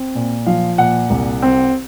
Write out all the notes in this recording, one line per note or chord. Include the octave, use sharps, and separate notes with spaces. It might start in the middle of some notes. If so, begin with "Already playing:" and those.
Already playing: C4
A#2
F3 F5
A#2 F#5
C2
C4